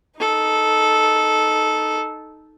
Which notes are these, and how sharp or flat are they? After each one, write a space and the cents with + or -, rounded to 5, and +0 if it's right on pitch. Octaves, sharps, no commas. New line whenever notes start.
D#4 +0 A4 -10